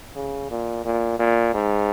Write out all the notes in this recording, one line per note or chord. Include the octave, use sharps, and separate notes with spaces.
C#3
A#2
A#2
A#2
G#2